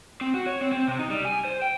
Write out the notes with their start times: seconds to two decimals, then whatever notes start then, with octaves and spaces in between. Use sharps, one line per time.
0.21 C4
0.34 F#4
0.46 C#5
0.61 C4
0.72 C4
0.88 C3
0.99 D#4
1.10 G3
1.25 G#5
1.45 C5
1.62 G5